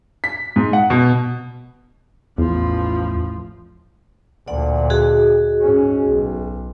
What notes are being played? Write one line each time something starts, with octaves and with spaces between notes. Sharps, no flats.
B6
G#2
F#5
B2
A1 E2 F3
D2 A#2 D5 F#5
F#4 G#4 D#5
G#2 C#4
B1